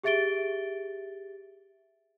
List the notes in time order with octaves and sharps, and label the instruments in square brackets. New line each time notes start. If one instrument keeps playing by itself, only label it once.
[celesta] G4 G#4 E5 A6 D7 G7